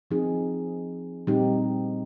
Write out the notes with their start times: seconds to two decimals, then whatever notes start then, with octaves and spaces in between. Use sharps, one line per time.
0.11 F3 C4 D#4 G#4
1.27 A#2 G3 C4 D#4 G4